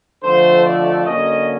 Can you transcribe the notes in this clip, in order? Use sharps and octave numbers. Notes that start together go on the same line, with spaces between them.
F2 D3 F3 A3 C5
D5
D3 F#3 A#3 C#4 D#5